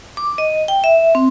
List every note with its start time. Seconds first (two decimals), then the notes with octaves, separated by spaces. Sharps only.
0.17 D6
0.38 D#5
0.68 G5
0.84 E5
1.15 C4